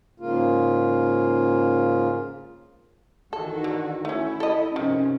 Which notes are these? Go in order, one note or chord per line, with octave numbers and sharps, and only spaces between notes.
G#2 C#3 A#3 F4
D#3 E3 F#4 A4
D3
A3 C#4 E4
A4 D#5
C3 D#3 F3 C#4